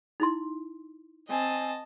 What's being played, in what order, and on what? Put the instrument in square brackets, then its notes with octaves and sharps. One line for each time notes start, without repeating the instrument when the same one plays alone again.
[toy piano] D#4 E4 C6
[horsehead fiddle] C4 G#5 [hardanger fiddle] D#5 A5